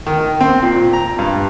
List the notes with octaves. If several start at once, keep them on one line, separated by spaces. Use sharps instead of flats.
D#3
C4
A#2
A#5
G2